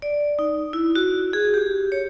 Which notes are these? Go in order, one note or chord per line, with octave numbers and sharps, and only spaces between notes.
D5
D#4
E4
F#4
G#4
G4
C#5